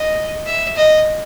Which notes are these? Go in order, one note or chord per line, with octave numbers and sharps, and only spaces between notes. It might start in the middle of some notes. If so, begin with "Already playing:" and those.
Already playing: D#5
E5
D#5